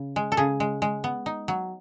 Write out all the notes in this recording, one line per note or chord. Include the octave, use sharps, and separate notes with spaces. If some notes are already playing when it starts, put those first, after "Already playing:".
Already playing: C#3
G#3
A4
C#3 G#4
G#3
G#3
B3
D#4
F#3